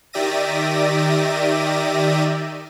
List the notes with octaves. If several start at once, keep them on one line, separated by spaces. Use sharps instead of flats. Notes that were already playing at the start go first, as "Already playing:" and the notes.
D#3 G4 D5 E5 A#6 D#7